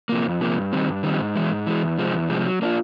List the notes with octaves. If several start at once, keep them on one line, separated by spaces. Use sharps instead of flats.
C3 F3 A#3
F2
C3 F3 A#3
G2
D#3 G3 C4
G2
D#3 G3 C4
G#2
E3 G#3
G#2
E3 G#3
E2
C3 F3 G#3 C4
E2
C3 F3 G#3 C4
F#3
A#3 D4 F4